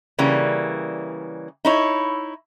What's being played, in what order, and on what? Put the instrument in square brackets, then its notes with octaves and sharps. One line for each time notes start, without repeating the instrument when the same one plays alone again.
[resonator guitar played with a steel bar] C#3 E3 G3 A#3
D#4 E4 C#5